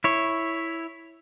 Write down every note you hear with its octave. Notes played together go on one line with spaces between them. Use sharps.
E4 C#5